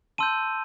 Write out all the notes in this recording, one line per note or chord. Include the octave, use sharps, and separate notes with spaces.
A5 C6 E6 G6 D#7